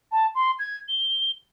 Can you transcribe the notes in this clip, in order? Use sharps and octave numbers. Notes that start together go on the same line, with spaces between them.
A5
C6
G#6
G7